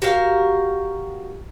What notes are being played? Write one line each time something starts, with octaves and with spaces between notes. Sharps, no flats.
F#4 G4 A#4 F5